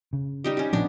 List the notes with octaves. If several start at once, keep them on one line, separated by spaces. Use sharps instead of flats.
C#3
G3 D#4 G4
C#4 G4
A#2 F3 G3 B3 D4